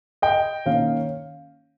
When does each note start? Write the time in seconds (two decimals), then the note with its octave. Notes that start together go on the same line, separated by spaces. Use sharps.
0.22 D#5 G5
0.66 D#3 A#3 C#4 F5